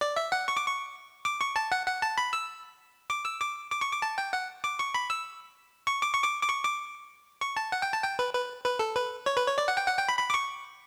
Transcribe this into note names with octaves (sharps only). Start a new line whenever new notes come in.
D5
E5
F#5
C#6
D6
C#6
D6
C#6
A5
F#5
F#5
A5
B5
E6
D6
E6
D6
D6
C#6
D6
A5
G5
F#5
D6
C#6
B5
E6
C#6
D6
C#6
D6
D6
C#6
D6
C#6
A5
F#5
G5
A5
G5
B4
B4
B4
A4
B4
C#5
B4
C#5
D5
F#5
G5
F#5
G5
B5
B5
D6
C#6